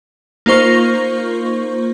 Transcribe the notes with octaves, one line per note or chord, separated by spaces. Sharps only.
A#3 D#4 F4 C5 C#6